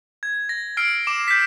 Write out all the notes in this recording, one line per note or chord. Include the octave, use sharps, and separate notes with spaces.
G#6
A#6
E6 F6 G#6 C7 D7
D6 E7
G6 B6